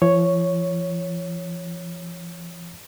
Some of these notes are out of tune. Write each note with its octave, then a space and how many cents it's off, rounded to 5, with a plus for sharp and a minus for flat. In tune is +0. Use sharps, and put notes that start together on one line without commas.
F3 -40 C#5 +0